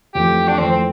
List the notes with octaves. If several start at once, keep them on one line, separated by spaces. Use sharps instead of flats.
F2 E3 A3 G4
D4
F2 E3 A3 C4
C4